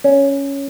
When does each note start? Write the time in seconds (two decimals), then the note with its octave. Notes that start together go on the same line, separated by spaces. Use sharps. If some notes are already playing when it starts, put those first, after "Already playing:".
0.04 C#4